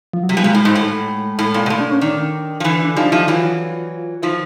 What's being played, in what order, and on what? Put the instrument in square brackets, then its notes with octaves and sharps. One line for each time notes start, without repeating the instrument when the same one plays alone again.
[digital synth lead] F3
F#3
[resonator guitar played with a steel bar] C3
[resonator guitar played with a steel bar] B2 [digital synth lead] G3
[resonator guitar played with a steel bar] A#2 [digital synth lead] G#3
[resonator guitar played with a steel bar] A2
G#2
A2
A2
A#2
B2
[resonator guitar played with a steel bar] A#2 [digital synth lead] A3
[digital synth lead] D4
C#4
[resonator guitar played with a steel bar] D#3 [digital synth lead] D4
[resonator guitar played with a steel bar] F3
D3 E3
[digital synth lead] D4
[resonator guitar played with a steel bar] F3 G3 [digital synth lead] D#4
[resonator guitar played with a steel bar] F3 G3 [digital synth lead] E4
[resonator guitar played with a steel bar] E3 F#3 [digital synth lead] F4
[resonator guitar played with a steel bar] D#3 F3 [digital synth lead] E4